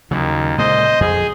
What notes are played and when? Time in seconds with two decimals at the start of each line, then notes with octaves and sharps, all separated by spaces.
0.11 D#2 C#3 F#3
0.58 A#2 C#3 G#3 C5 D#5
1.01 F2 G#4